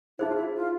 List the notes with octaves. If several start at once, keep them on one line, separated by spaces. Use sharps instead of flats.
D#4 E4 G#4 C5
F4
E4
F4